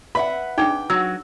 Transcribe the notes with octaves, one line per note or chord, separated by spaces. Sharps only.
B4 E5 F#5 B5
D4 D#4 G#4 G5
F#3 F#4 E6